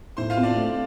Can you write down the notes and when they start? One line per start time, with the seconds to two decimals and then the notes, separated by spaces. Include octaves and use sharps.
0.17 A2 C5 C6
0.30 F4 F5
0.37 C4
0.43 D4 D5
0.56 A3